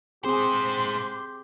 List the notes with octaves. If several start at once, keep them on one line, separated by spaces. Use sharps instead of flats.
G#3 C4 G4 G#4 C5 C6